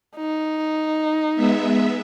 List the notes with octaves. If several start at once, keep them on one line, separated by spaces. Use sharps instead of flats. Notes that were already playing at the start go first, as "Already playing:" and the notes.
D#4
G#3 B3 E5